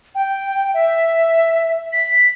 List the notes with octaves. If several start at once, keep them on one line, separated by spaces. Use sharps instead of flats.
G5
E5
B6